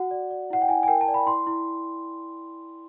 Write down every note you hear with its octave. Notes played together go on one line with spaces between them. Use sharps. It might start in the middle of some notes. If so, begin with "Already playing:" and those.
Already playing: F#4 F#5
D5
D5
E4 F#5
G5
E4 G#5
G#5
A#4 G5
A5
D5
B5
E4 C6
E4